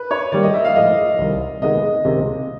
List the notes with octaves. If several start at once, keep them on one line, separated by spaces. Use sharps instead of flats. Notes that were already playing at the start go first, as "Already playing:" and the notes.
Already playing: B4
C#5
D#3 G3 A#3 D5
D#5
E5
F5
A2 F3 G#3 D#5
C2 C3 D#3
C3 D#3 G#3 B3 D#4 D#5
C#2 C3 D#3 G#3